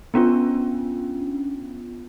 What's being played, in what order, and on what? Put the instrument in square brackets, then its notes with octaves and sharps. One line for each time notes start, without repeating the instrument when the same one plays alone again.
[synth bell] B3 C#4 D4 F4